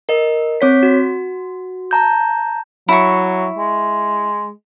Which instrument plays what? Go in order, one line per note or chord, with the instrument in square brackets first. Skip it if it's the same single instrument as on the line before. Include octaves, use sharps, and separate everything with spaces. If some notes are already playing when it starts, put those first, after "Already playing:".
[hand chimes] A#4 D#5
C4 C#5 B6
F#4
A5 A#5 G6
[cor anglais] F#3 [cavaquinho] E4 C#6
[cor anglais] G#3